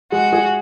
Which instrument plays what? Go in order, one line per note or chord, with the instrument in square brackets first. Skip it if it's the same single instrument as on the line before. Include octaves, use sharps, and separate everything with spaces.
[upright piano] G#3 [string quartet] F#4
[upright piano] G#4